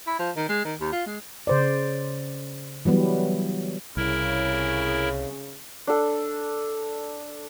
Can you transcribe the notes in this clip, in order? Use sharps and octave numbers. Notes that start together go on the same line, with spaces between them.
E4
F3
D#3
G#3
D#3
D#2
F4
G#3
C#3 C5 D5
E3 F#3 G3 B3
C2 C#3 E4 A#4
D4 A4